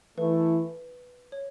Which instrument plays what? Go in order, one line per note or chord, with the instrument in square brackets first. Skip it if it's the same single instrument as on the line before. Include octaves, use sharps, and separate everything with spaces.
[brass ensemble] E3 A3 E4 [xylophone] B4
[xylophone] C#5